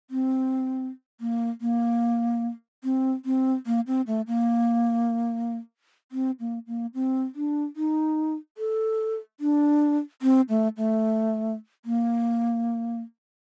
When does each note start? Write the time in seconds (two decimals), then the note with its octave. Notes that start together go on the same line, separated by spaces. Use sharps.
0.10 C4
1.21 A#3
1.61 A#3
2.84 C4
3.25 C4
3.66 A#3
3.87 C4
4.07 A3
4.27 A#3
6.12 C4
6.40 A#3
6.67 A#3
6.94 C4
7.35 D4
7.76 D#4
8.58 A4
9.40 D4
10.22 C4
10.49 A3
10.77 A3
11.85 A#3